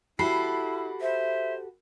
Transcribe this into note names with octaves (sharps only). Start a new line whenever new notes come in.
E4 F#4 G4 A4 B5 C7
C5 E5